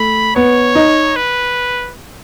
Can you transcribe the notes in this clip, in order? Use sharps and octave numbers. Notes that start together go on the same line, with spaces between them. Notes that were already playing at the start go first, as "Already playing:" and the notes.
Already playing: A3 B5
B3 C#5
D#4
B4